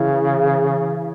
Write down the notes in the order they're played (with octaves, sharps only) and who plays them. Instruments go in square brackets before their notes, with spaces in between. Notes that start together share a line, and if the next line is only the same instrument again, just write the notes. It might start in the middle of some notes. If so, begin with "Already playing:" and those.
Already playing: [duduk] C#3 [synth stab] E3